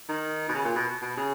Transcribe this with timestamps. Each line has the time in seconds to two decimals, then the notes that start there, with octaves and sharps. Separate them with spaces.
0.09 D#3
0.49 B2
0.54 C#3
0.65 A#2
0.76 B2
1.02 B2
1.17 C#3